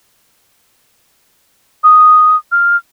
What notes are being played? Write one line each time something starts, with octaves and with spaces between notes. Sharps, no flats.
D#6
F6